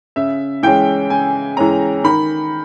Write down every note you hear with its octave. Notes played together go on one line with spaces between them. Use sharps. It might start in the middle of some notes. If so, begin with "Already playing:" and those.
C#3 E5
E3 G#3 C#4 G5
C#3 G#5
E3 G#3 C#4 A#5
D#3 B5